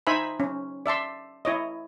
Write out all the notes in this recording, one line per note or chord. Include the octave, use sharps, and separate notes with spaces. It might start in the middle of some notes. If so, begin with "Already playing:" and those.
D#4 C5 E5 G#5 B5
C#4
D5 E5 A5 C6
E4 C#5 D#5